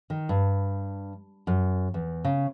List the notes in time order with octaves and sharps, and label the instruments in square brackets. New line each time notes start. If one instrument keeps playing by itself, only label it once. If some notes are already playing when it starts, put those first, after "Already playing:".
[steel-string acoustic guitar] D#3
G2
F#2
E2
C#3